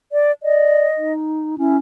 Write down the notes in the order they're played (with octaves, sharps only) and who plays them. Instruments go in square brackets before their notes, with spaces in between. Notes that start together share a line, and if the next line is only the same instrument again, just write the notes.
[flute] D5
[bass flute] D5 [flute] D#5
[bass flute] D#4
[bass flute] C#4 [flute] E4